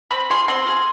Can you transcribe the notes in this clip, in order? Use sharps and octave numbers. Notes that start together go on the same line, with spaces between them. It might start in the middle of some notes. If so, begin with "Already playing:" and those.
C4 B5
F4 G#4 C6
C4 C6
F4 G#4